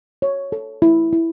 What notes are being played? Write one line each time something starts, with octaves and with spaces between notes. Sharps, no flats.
C#5
A4
E4
E4